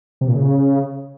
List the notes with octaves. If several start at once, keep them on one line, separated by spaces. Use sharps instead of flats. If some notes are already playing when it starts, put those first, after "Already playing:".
C3
A#2
C#3